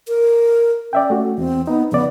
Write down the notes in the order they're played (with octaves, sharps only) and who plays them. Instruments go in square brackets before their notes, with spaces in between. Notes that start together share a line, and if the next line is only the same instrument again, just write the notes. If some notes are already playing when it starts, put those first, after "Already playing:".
[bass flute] A#4
[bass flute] C#4 [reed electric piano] D5 E5 G5
[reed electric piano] A3 F#4
[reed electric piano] E2 [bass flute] C4
[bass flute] B3 [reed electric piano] D#4
[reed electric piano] F2 C#3 D5 [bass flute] B3